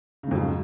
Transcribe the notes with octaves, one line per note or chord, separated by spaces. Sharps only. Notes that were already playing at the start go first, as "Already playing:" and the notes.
F2 G#2 C#3 F#3